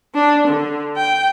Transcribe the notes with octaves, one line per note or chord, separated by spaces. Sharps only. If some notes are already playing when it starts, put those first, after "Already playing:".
D4
D3
G5